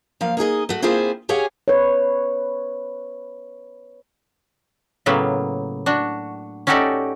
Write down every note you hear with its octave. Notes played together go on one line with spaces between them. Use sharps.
F3 A#3 F5
A#3 D#4 G#4 D#5
A3 F#4
A#3 C4 E4 F4 G#4 C5
G4 G#4 C#5 F5 F#5 G#5
B4 C#5
A2 C#3 F#3 A#3 B3
D4 F#4
C#4 D#4 F#4 G4 A4 D5